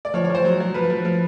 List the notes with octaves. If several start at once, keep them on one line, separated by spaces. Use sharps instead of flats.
D5
F3 C#5
C#5
F3 C5
F#3
F#3
F3 B4
F3
F3